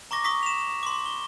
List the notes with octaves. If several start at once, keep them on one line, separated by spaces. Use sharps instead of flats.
A#5 C#6 D6 A#6
C#6 D#6 B6
E7 F7
C6 D6
G7